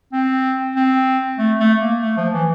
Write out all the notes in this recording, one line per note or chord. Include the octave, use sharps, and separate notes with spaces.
C4
C4
A3
A3
A#3
A3
F3
E3